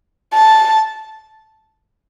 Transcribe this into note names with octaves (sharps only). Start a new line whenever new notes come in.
A5